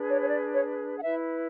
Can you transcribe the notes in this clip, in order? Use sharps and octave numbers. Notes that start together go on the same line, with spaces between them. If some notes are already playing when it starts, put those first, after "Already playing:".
Already playing: D4 G#4 B4
C#5
C#5
D5
C#5
F#5
E4 B4 E5